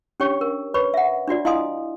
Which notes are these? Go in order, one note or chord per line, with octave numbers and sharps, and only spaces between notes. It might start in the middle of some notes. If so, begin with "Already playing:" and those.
C#4 D4 G4 C#5 G5 C#6
A#4
B4 C#5 B5 C#6
E5 F#5
D4 F4 F#4 D5
E4 D#5 F5 G#5 C6 D#6